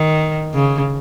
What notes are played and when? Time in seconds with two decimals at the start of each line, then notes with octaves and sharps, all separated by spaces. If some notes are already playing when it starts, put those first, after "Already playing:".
Already playing: D#3
0.54 C#3